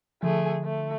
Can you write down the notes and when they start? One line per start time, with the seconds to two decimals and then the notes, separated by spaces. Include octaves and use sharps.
0.23 D3 F3 A3 G#4
0.64 A3